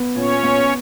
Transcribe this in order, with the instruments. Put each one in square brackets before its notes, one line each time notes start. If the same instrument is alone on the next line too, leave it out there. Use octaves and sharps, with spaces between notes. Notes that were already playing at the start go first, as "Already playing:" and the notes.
Already playing: [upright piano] B3
[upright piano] A#2 [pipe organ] C#4 C#5
[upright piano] B3